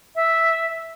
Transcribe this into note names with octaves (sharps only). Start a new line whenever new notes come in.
E5